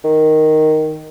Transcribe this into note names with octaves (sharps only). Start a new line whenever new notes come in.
D#3